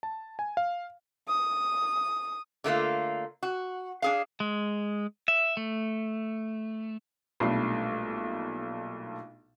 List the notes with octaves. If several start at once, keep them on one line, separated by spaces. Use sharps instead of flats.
A5
G#5
F5
D#6
D3 A3 A#3 F4
F#4
D4 G#4 F5
G#3
E5
A3
B1 A#2 G3 A3 D4 C7